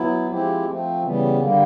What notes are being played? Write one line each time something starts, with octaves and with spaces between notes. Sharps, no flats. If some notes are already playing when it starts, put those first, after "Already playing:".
Already playing: F#3 B3 E4
F3 G#3 C4 E4 G4
F3 A3 C4
C#3 E3 G3 B3
D3 G3 A#3